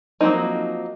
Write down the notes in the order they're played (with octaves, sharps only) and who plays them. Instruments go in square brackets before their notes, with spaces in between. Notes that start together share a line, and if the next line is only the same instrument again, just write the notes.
[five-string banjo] F3 F#3 A#3 C4 D#4